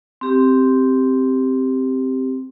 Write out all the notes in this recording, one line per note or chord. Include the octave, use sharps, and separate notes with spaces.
C4 G4